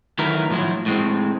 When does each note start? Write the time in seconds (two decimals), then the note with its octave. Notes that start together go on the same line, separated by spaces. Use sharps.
0.19 D#3 F#3 A3 E4 A#4 B4
0.50 A2 F3 F#3 E4
0.86 A2 G#3 C4